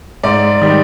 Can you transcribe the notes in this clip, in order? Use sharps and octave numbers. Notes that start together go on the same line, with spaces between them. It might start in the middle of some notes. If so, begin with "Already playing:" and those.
G#2 D5
D#3 G3